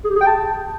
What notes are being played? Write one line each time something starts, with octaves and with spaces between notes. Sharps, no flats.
G#4
G4
G#4
G5
A5